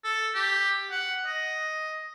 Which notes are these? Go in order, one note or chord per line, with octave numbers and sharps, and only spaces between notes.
A4
G4
F#5
D#5